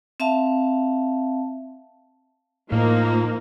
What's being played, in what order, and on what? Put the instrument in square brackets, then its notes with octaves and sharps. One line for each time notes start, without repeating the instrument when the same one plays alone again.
[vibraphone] C4 E5 F5 A5
[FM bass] A2 [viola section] F3 A#3 D#4